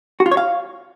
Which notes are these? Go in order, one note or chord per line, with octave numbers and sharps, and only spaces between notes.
F#4
F4
C#5
F5